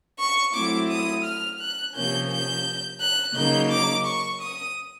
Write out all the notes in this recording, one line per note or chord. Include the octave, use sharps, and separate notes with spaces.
C#6
F#3 A3 C4 E4 D6
D#6
F6
F#6
C3 F3 A#3 C#4 G6
G6
F#6
C#3 F#3 A#3 D#4 G6
D6
C#6
D#6